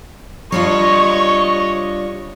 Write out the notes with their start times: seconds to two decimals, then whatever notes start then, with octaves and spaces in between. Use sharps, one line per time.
0.52 G3 D4 F4 C#5 D#5 C#6